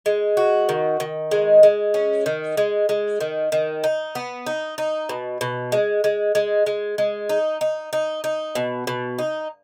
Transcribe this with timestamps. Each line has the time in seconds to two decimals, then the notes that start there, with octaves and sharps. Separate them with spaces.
0.06 G#3
0.37 F#4
0.69 D#3
1.00 D#3
1.31 G#3
1.63 G#3
1.94 C#4
2.26 D#3
2.57 G#3
2.89 G#3
3.21 D#3
3.52 D#3
3.84 D#4
4.15 B3
4.47 D#4
4.78 D#4
5.09 B2
5.41 B2
5.72 G#3
6.04 G#3
6.35 G#3
6.66 G#3
6.98 G#3
7.29 D#4
7.61 D#4
7.93 D#4
8.24 D#4
8.55 B2
8.87 B2
9.18 D#4